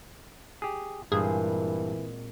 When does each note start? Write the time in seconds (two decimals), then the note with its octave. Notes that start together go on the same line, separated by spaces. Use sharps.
0.62 G4 G#4
1.12 G2 A#2 E3 G#3 C4 G#4